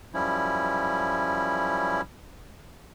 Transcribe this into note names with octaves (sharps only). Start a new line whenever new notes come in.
F#2 F3 G3 C#4 E4